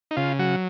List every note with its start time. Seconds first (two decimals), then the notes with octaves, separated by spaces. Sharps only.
0.11 D#4
0.17 C#3 F4
0.39 F#3 F#4